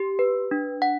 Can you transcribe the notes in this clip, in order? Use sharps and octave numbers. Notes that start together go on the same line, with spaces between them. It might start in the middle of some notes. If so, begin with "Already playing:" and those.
Already playing: G4
B4
D4
F#5